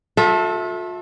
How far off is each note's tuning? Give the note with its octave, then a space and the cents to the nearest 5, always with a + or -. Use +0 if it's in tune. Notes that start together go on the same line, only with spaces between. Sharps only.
F4 +45 A4 +0 E5 -10